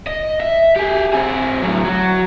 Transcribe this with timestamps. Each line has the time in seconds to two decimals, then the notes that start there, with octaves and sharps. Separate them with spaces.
0.07 D#5
0.40 E5
0.76 G4 G#4
1.13 C4 G#4
1.62 A2 F#3
1.85 F#3 F#4